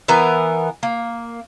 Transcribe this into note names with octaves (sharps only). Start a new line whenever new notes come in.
E3 B3 A#4
A#3